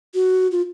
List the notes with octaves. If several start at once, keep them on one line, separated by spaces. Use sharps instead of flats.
F#4
F4